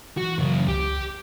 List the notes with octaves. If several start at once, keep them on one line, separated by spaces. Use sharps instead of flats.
E3 F#4
F#2 C#3
C#2 G4